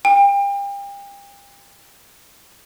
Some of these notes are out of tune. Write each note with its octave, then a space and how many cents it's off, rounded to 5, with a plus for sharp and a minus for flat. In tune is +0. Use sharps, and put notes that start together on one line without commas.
G5 +35